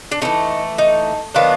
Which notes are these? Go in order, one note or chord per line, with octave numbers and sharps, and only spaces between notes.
D4
E3 A3 C#4 D#4
D#4
D#3 F#3 B3 D4 F4